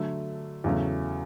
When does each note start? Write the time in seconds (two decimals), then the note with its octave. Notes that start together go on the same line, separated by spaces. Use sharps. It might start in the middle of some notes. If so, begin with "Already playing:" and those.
Already playing: D3 F#3 A3
0.64 E2 C#3 F#3 A3 C#4